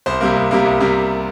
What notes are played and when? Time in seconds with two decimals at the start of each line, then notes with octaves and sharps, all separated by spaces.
0.06 C2 C5
0.21 C3 G3 A#3
0.36 C2
0.51 C3 G3 A#3
0.65 C2
0.80 C3 G3 A#3